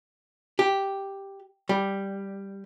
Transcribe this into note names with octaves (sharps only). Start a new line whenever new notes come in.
G4
G3